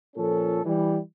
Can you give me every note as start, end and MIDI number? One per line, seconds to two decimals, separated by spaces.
0.16 0.59 46
0.16 0.59 53
0.16 0.59 61
0.16 0.59 69
0.65 0.99 52
0.65 0.99 55